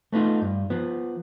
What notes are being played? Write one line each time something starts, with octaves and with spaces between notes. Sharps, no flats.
A3 B3 D#4 F4
G2
F3 B3